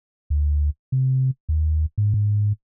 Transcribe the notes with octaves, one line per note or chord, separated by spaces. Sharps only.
D2
C3
D#2
G#2
G#2